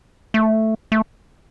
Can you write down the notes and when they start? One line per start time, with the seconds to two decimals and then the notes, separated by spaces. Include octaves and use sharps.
0.34 A3
0.92 A3